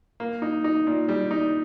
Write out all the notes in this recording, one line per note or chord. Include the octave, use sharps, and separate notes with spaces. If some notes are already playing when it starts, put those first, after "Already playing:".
A#3
D#4
D#4
A#2
G3
D#4